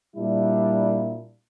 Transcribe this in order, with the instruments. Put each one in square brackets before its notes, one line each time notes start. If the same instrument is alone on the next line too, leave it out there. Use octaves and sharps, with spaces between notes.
[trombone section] A#2 G3 D4 E4